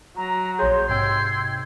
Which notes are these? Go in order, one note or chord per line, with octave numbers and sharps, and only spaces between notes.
F#3 A#5
A#1 G#4 C#5 C6 G6
G#2 C3 G5 C6 E6 G6 G#6